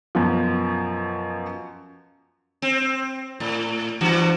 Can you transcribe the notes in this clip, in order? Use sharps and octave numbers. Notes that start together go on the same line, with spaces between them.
F#2 B2 F3
C4
A2
G2 E3 F#4